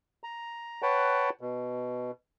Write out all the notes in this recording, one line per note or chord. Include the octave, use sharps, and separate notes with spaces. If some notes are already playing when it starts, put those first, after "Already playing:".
A#5
B4 C#5 F#5 G5 A5
B2